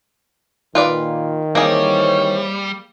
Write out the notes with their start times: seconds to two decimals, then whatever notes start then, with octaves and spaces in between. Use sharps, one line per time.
0.75 A#2 D#3 F4 B4 D5
1.55 E3 G3 A#3 C4 G#4 C#5